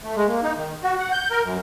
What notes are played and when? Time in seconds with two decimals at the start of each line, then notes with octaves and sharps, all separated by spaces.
0.03 A3
0.16 G#3
0.28 A#3
0.43 D#4
0.56 D#3
0.83 F#4
0.98 F#5
1.12 G6
1.30 A#4
1.43 F#2